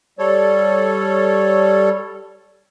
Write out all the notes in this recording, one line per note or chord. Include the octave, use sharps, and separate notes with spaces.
G3 A4 C#5